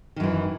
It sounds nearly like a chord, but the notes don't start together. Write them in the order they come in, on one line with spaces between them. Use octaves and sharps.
D#3 F#2 E3